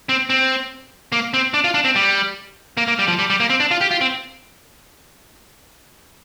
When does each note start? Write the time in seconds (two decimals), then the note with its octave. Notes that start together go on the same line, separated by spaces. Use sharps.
0.09 C4
0.30 C4
1.12 A#3
1.34 C4
1.54 D4
1.64 F4
1.74 D4
1.85 C4
1.96 G3
2.77 A#3
2.88 A#3
2.99 G3
3.08 F3
3.19 G3
3.30 G3
3.40 A#3
3.50 C4
3.60 D4
3.71 F4
3.81 G4
3.91 F4
4.01 C4